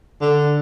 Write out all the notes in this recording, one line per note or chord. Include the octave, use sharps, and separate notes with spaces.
D3